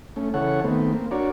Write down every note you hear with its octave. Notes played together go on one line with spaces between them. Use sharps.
A3 C#4
C#3 E3 A4 C#5 F#5
D#3 A3 B3 C4
A#3 C4
D4 F#4 A#4 C#5 D5